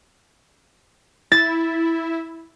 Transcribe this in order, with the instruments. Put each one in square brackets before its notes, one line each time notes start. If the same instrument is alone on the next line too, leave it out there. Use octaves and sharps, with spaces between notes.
[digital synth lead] E4 [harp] A6